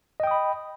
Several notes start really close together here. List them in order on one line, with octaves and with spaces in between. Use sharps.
D#5 G5 D#6 B5